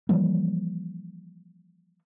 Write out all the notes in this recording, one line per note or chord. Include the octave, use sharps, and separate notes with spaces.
E3 F3 G3 A#3